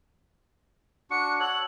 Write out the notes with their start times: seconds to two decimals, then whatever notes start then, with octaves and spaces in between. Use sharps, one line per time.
1.10 D4 F#4 C#7
1.40 A4 C#5 F#5 F#7